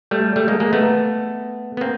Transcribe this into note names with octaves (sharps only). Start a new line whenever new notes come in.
G3 A3
G3 A3
G#3 A#3
G#3 A#3
A3 B3
B3
A#3 C4